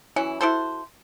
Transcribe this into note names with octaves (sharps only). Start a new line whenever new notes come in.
E3 F#3 C#4 E4
E4 F#4 A4 C5